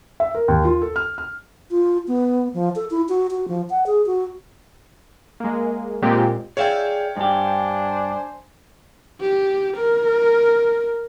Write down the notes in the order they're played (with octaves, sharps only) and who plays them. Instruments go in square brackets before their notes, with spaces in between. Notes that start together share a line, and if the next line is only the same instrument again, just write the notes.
[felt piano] E5
A#4
D#2
F4
A4
F6
F6
[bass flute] F4
B3
F3
A4
E4
F#4
F#4
F3
F#5
G#4
F#4
[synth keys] G#3 A#3
A#2 G#3 C4 G4
[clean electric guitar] G#4 D5 E5 [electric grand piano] C#5 F5 G5
[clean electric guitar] G2 G4 [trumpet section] D4 C5 G#5
[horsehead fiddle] G4
A#4